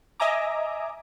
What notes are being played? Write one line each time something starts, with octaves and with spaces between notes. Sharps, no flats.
D#5 E5 G#5 A#5 D6